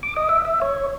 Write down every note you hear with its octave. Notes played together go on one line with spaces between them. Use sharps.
D6
D#5
E5
E5
C#5